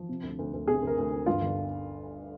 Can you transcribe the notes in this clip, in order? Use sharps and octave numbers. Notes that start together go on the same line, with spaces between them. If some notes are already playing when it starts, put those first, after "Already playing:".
Already playing: F3
C3
D2
D2
D2
C3 G#4
D2 A#4
D2
D2
G2 F4
G1